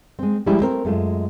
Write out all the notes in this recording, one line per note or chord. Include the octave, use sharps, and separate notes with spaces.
G#3 C4
F3 G3 G#3 C#4 E4 G4
A3 C4 A#4
F#2 G#3 A3 F4